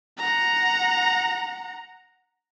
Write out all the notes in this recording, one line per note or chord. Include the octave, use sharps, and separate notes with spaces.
F#5 A#5